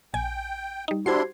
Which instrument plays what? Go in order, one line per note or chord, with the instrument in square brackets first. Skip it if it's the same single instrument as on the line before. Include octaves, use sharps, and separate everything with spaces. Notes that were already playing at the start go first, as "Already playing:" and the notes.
[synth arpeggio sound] A#1 G#5 [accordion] G5
[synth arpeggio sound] G3 D#4
[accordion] D4 E4 C6 [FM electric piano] F#4 G4 C5 [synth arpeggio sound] G#6 C7